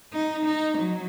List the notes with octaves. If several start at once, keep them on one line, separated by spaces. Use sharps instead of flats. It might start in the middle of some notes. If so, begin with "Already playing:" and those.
D#4
D#4
F#3